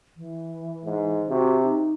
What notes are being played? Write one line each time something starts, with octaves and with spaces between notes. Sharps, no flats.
E3
G#2
C3 F#4
D#4